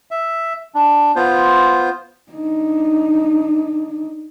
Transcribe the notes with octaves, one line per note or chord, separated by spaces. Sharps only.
E5
D4
B3 F4 C5
D4 D#4